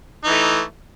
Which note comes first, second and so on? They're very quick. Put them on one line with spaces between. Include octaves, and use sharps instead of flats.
D#4 E3 A3